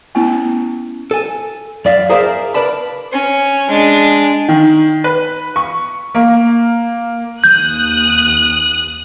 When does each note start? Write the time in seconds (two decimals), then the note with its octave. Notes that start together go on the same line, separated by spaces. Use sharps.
0.15 A3 B3 C#4 E4
1.11 A4 G#5
1.85 F#2 D5 E5 F5
2.09 G#4 A#4 C5 D5 E5 F5
2.54 A#4 B4 D5 A5 B5
3.13 C#4
3.68 G#3 D4
4.48 D#3
5.04 B4
5.56 C#6
6.15 A#3
7.44 D#2 D#6 F#6 G6